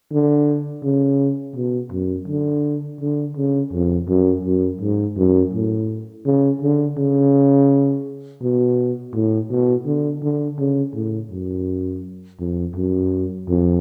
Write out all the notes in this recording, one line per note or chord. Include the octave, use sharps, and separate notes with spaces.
D3
C#3
B2
F#2
D3
D3
C#3
F2
F#2
F#2
G#2
F#2
A2
C#3
D3
C#3
B2
A2
B2
D3
D3
C#3
A2
F#2
F2
F#2
F2